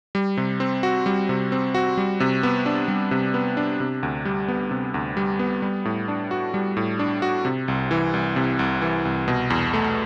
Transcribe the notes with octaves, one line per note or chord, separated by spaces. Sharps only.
G3
C3
C4
F#4
G3
C3
C4
F#4
G3
C3
B3
D4
G3
C3
B3
D4
C3
D2
G3
B3
C3
D2
G3
B3
G3
A2
D4
F#4
G3
A2
D4
F#4
C3
C2
E3
C2
C3
C2
E3
C2
B2
E2
A3